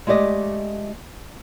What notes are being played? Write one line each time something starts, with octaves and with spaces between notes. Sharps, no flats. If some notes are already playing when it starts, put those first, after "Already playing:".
G#3 A3 G4 D5 D#5